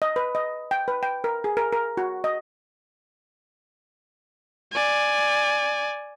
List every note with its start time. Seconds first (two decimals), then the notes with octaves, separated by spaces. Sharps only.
0.02 D#5
0.16 B4
0.35 D#5
0.71 G5
0.88 B4
1.03 G5
1.24 A#4
1.44 G#4
1.57 A#4
1.73 A#4
1.97 F#4
2.24 D#5
4.72 D5 G#5